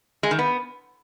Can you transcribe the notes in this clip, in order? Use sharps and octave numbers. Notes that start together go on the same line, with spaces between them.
G#3
D#3
B3